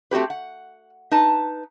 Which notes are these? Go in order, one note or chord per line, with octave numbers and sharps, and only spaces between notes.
A3 C4 F#4 G4 B4
F#5
D#4 B4 A5